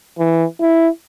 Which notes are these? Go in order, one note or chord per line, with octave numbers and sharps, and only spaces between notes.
E3
E4